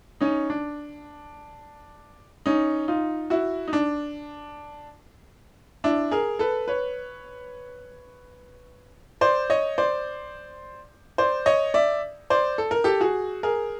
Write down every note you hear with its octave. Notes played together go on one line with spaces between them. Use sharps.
C#4 D#4
D4
C#4 D#4
D#4 F4
E4 F#4
D#4
D4
D4 E4
G#4 A#4
A4 B4
B4 C#5
C5 D5
C#5 D#5
C5 D5
C5 D5
C#5 D#5
D5 E5
C5 D5
A4
A#4
G4 A4
F#4 G#4
G#4 A#4